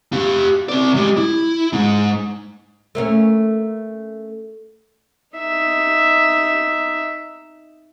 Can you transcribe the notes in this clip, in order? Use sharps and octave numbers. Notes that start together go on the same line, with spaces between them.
G4 F5
C4 D5
G#3 G4
E4
G#3 D#4
A3 A#3 C#4
D#4 E5